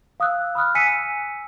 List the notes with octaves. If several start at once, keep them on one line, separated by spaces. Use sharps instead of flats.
F5 D#6 E6 F#6
B5 D#6 F6 F#6
G#5 E6 B6 C#7 D#7